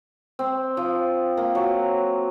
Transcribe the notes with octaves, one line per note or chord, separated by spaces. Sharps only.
C4
F3
A#3
F#3